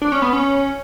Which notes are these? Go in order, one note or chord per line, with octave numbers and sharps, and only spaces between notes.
D4
C#4
B3
C#4